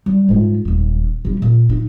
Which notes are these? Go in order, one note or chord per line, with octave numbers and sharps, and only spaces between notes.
G3
G#2 F4
D#1 D#2
C3 G3
A#2
D#4